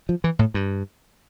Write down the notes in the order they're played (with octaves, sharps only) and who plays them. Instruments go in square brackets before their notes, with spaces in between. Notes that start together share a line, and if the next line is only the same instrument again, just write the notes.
[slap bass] F3
E3
A2
G2